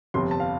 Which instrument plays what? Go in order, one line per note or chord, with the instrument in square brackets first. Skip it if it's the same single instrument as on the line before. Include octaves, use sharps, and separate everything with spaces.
[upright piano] G1 F2 C3 [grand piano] C6
[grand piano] A5
F5